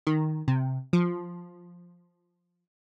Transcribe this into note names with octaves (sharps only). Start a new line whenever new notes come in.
D#3
C3
F3